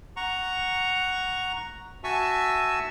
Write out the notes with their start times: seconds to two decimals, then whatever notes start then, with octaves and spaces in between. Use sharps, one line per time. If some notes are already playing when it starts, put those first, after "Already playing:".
0.16 F#5 A#5 C#6
2.04 F#4 E5 G#5 A5 C#6 E6